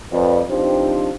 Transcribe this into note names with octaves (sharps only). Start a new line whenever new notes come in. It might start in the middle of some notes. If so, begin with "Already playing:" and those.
F2 B4 D5
F3 C4 D4 D#4 G4 C5